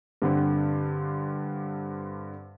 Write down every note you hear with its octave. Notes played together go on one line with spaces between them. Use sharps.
G2 D3 C4